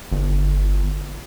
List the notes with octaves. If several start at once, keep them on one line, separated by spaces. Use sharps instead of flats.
G1